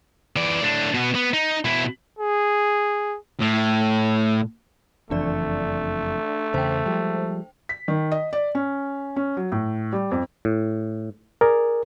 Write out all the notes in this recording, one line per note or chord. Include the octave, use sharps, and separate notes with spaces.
E3 D5
A2 D4
B2 B3
B3
D#4
B2 E4
G#4
A2
F#1 F2 E3 A3 D4 D5
E2 C#3 C5 G5
F3 G3 G#3
B6
D#3
D#5
D5
C#4
C#4
F#3
A2
G3
F2
A2
G#4 A#4 D5